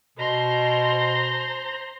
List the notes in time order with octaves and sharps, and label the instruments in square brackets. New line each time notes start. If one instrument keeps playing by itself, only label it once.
[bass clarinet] B2 [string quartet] C5 A#5 C6